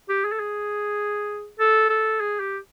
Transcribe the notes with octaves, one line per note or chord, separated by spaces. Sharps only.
G4
G#4
A4
G#4
A4
A4
G#4
G4